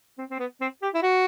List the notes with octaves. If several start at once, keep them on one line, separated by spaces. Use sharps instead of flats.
C4
C4
B3
C4
G4
E4
F#4